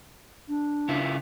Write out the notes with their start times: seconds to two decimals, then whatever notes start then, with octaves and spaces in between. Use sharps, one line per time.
0.48 D4
0.89 C#3 E4 F4